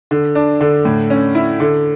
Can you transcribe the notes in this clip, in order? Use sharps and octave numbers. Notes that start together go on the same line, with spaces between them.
D3
D4
D3
A2
C#4
E4
D3